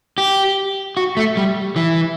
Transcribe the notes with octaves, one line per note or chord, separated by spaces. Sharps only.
G4
F#4
A3
G3
E3